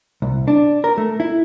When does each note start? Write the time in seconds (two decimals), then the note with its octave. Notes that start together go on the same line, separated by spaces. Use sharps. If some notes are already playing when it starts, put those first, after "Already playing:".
0.22 C2
0.48 D4
0.84 A#4
0.98 A3
1.20 E4